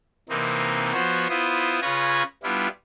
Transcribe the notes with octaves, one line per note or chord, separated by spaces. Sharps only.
C3 E3 A#3 C4 D#4
F3 B3 F#4 C5 C#5
B3 E4 F4 C5 D#6
C#3 F4 B4 C#5 G#5 A#6
G3 B3 D4 E4 F4